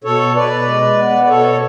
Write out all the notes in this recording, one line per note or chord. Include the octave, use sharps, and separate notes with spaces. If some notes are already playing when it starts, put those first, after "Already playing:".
B2 A4 C#5
B2 B4 D5
G#3
B3
D5
B2 A4 C#5